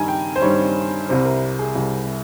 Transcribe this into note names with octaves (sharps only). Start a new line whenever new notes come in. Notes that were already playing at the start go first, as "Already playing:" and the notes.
Already playing: G2 D#3 G3 G#5 A#5
G5
C5
G2 D#3 G3 C#5
C2 C3 G3 C5
A#4
G#4
C2 C3 G3